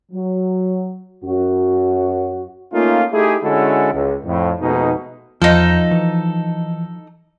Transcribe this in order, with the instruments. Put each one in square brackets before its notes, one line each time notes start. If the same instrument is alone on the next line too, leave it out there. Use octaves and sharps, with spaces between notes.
[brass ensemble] F#3
F#2 F#4
[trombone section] A3 A#3 C#4 D#4 F4
A3 D#4 E4 G4 G#4
D3 G#3 C#4 E4 F#4 A4
C#2
F2 A2
F2 B2 G#3 A3 D#4
[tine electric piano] E2 [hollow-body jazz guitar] F3 [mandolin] D#4 A4
[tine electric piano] E3